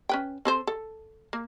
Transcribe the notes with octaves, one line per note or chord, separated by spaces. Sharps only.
C#4 B4 G5
C4 A4 C5
A4
A#3